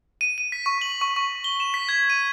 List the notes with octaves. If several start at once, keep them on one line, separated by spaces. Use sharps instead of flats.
D#7
D#7
B6
C#6
F#7
C#6
C#6
G7
E7
B6
G#6
D#7